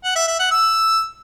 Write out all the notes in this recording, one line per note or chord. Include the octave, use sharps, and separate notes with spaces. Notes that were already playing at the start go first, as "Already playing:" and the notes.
F#5
E5
E5
F#5
E6